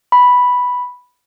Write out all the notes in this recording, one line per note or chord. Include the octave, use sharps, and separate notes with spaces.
B5